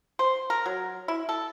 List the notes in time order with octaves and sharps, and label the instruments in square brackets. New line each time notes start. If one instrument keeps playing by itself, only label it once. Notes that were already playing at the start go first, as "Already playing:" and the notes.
[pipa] C5
A#4
F#3
E4
A4